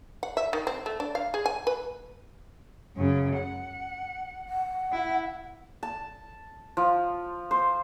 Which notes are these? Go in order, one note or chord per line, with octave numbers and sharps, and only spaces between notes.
F#5
E5
D#3
C4
A3
D4
F5
G#4
G#5
B4
F#2 C#3
F#5
F#5
E4
A5
F3
C5